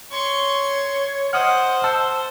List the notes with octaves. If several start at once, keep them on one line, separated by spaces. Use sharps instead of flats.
C#5 C6 C#6
C5 D#5 F#5 D#6 F6
A5 E6